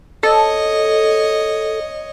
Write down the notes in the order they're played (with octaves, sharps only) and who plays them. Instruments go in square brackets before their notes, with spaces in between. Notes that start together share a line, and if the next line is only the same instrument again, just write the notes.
[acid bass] A4 [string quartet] C#5 D#5